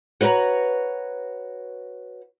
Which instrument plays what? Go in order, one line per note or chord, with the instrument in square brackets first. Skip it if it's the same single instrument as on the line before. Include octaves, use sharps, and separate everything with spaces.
[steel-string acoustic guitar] F#4 B4 C#5 G5 A#5